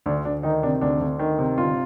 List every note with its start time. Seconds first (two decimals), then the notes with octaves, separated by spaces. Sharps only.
0.06 D2 D4
0.25 D2 D4
0.43 D#3 D#4
0.63 C3 D4
0.81 D2 D4
1.01 D2
1.19 D#3
1.39 C3
1.58 G1 F4